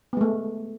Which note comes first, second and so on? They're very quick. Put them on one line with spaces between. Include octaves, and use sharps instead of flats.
B3 G#3 A3